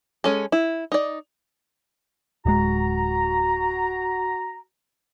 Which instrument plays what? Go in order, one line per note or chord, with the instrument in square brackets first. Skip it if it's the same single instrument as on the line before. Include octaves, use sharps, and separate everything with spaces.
[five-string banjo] G#3 C#4 A4
E4
D#4 D5
[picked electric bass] D1 G#3 [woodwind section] F#4 A#5